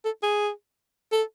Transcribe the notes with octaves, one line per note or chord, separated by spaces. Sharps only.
A4
G#4
A4